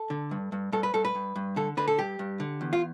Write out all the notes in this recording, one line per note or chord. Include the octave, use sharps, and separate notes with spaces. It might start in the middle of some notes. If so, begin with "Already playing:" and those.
Already playing: A4
D3
G2
G2
G2 A4
B4
G2 A4
B4
G2
G2
D3 A4
D3 B4
A4
G2 G4
G2
D3
E2
F4